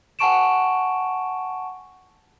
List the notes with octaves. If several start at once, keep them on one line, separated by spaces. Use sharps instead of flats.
F#5 G#5 A5 C#6 D7 E7